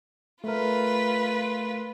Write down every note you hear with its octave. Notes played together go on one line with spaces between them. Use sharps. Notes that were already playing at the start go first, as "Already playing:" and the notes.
A3 F4 A#4 B4